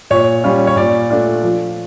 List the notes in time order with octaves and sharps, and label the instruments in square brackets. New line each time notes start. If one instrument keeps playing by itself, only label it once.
[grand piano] A#2 C#5
G3 C#4 F4
C#5
A#2 D5
A3 D4 F4
F3